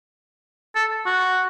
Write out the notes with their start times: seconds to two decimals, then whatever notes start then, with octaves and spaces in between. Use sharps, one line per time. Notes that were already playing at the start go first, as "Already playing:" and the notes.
0.75 A4
1.06 F#4